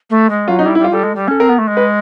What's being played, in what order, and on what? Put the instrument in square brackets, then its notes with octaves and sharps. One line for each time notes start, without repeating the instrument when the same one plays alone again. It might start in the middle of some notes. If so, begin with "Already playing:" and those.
[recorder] A3
G#3
[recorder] F#3 [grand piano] F4
[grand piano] D#4
[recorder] G3 [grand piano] E4
[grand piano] E4
[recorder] G3
[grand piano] F4
[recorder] G3 [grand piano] A4
[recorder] G#3
G3
[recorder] C#4 [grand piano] A4
[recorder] C4 [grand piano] A#4
[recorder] B3
A3
G#3
[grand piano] B4